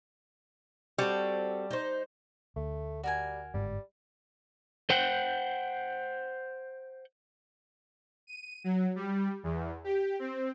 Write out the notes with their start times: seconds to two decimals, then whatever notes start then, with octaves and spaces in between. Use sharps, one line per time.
0.98 G3 C4 F#4 A4
1.71 D#4 C5
2.56 D2 A3
3.03 G3 F#4 A#4 G#5
3.54 G1 G#2 G3
4.90 C5 F#5 G5
8.27 D#7
8.64 F#3
8.95 G3
9.43 E2
9.84 G4
10.19 C4